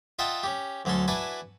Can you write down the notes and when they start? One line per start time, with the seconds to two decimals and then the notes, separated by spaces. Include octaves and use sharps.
0.19 F4 D#5 E5 F#5 G5 A5
0.43 C#4 G4
0.85 D2 F#3 C#4 A4 C6
1.08 D4 E4 F#4 B4 G#5 A5